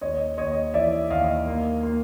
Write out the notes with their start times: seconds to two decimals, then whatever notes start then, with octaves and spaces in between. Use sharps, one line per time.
0.01 D#2 C#5 D#5
0.38 D#2 C#5 D#5
0.74 E3 D5 E5
1.10 D#2 D#5 F5
1.46 A#3
1.83 A#3